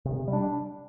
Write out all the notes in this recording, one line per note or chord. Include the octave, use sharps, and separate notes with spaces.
C3
G3
D4